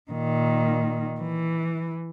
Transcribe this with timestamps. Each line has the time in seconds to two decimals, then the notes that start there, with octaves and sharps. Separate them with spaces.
0.11 A#2 D#3
1.21 E3